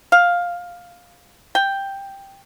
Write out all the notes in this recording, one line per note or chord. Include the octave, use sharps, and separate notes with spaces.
F5
G5